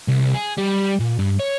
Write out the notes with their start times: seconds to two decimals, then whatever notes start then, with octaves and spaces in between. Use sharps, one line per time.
0.08 C2
0.34 G#4
0.57 G3
0.99 A#2
1.19 G2
1.40 C#5